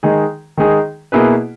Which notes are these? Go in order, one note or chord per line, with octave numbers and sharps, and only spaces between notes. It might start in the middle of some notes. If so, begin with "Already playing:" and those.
D#3 G#3 D#4 G#4
D#3 G#3 D#4 G#4
B2 A#3 E4 G#4 B4